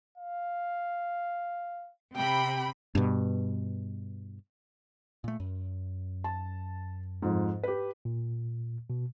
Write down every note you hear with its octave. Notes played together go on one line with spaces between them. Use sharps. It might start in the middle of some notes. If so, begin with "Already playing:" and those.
F5
C3 G5 B5
G2 B2
A#2 A3
F#2
A5
F2 G#2
G4 B4
A#2
B2